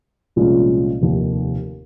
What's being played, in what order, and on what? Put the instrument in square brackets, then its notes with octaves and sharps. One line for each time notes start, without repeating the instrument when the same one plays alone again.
[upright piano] C2 A#2 F3 G#3 C#4
F1 D#2 D#3